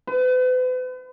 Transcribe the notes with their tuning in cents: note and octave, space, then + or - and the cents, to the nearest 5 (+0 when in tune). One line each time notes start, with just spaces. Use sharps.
B4 +40